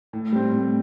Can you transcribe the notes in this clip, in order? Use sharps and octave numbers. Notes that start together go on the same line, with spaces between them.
A2
G3 C4
A2